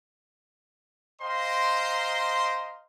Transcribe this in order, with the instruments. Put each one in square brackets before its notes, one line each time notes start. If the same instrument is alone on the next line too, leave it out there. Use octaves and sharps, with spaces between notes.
[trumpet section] C5 D#5 F5 G5 A#5 C6